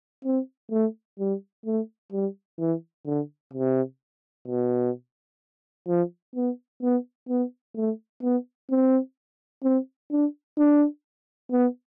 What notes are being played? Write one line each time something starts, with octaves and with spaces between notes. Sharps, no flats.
C4
A3
G3
A3
G3
E3
D3
C3
B2
F3
B3
B3
B3
A3
B3
C4
C4
D4
D4
B3